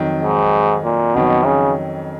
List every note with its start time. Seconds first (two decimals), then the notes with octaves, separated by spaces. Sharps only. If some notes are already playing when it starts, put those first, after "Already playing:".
Already playing: F2 D#3 F#3
0.22 G#2
0.84 A#2
1.15 F2 B2 D#3 F#3 C#4
1.45 C#3